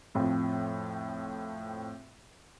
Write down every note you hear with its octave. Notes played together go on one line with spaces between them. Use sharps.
F2 A2 F3 C4